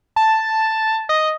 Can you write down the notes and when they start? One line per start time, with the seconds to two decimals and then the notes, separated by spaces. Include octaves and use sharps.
0.16 A5
1.09 D#5